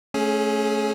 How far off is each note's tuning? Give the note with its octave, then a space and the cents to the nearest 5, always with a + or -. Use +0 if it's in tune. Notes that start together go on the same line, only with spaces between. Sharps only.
A3 -15 C#4 -5 G#4 +20